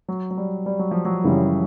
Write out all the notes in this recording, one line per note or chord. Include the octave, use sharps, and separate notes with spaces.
F#3
F#3
G3
G3
F#3
F3
F#3
F#2 C#3 E3 G3